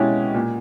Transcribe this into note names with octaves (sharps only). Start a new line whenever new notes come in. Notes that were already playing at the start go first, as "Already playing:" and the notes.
Already playing: B2 G#3 C#4 E4 G4
A#2